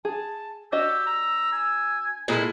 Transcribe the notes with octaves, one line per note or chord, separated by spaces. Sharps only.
G#4 A5
D4 F#4 G4 D#5 E6
A#5
G#5
A#2 G#3 E4 A4